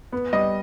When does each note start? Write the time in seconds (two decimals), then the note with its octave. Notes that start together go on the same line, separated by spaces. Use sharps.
0.12 B3
0.33 G3 D#5